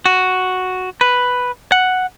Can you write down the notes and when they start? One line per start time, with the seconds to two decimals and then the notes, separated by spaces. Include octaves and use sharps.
0.06 F#4
1.01 B4
1.72 F#5